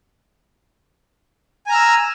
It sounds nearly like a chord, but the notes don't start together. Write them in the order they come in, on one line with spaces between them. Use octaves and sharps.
G#5 A#5 F6 E6